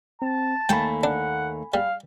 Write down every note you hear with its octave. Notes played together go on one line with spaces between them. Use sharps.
C4 A5
D#2 A3 A#3 G5 G#5 B5
D4 F#5
G3 F5